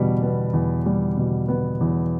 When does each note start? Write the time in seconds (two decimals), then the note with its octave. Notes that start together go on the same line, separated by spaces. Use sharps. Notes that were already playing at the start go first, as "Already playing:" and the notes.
Already playing: E2 B2 G3
0.22 B3
0.53 E2
0.86 G3
1.17 B2
1.48 B3
1.81 E2